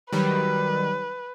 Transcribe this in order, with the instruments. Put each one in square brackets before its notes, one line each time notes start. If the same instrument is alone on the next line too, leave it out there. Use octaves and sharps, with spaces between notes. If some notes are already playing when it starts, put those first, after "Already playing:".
[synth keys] D#3 F#3 G3 [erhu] B4